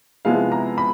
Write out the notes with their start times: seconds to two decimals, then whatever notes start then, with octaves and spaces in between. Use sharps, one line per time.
0.25 C3 F3 G#3 B3 E4 F5
0.52 A#5
0.78 B5